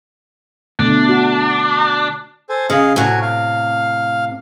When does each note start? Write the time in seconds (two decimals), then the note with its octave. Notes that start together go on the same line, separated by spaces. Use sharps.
0.79 B2 D3 A3 D4
1.09 F#4
2.49 A4 C5 G#5
2.70 C#3 G#4 D#5 F5
2.96 A2 C3 F#4 G#5
3.22 F5